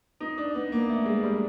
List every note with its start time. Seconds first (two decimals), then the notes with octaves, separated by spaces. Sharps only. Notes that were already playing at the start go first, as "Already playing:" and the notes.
0.21 D#4
0.38 D4
0.55 B3
0.72 A#3
0.89 A3
1.06 G#3
1.23 G3